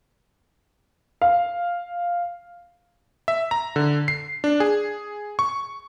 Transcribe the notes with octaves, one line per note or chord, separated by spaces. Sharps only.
F5
E5
A#5
D3
C7
D4
G#4
C#6